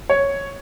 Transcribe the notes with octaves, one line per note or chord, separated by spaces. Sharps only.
C#5